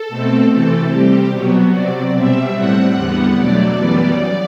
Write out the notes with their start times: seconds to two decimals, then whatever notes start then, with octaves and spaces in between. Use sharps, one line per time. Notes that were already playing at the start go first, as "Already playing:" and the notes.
Already playing: A4
0.09 B2 A3 C4
0.50 C3 E3 A3 C4 A4
0.91 C3 G3 C4 G4
1.32 B2 F#3 B3 F#4
1.73 C3 F#3 C4 D5
2.14 B2 G3 C4 E5
2.55 A2 G3 C4 F#5
2.96 E2 D3 G3 B3
3.37 B2 F#3 A3 D5
3.78 F#2 E3 G3 B3